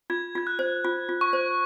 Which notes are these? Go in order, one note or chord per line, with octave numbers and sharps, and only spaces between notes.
F4 G#6
F4 G#6
F#6
C5
F4
F4
C#6
C5